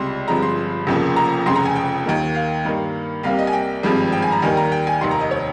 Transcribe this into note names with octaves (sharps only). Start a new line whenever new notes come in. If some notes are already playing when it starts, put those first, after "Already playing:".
Already playing: C#2 C3 G3 C6
G1 G2 F3 G#3 C4 A#5
C6
F1 F2 C#3 F3 A#3
A#5
F1 F2 C#3 C6
A#5
G#5
G5
D#2 D#3 A#3
F5
G2 D#3 A#3
C2 C3 G3 A#3 F5
D#5
G#5
G5
G#1 G2 F3 G#3 C4
G5
G#5
A#5
D#2 D#3 G3 A#3 G#5
A#5
G5
G#5
F1 D#2 D#3 C6
A#5
D#5
C#5